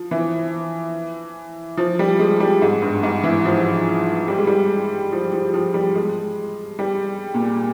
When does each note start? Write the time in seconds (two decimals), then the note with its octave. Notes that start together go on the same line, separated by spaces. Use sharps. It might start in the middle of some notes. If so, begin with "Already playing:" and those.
Already playing: F3
0.11 E3
1.77 F3
1.99 G3
2.19 G#3
2.40 G3
2.62 G#2
2.82 G2
3.03 G#2
3.23 E3
3.45 F3
4.28 G3
4.38 G#3
4.47 G3
5.12 F3
5.32 F3
5.54 F3
5.74 G3
5.95 G#3
6.79 G3
7.34 A#2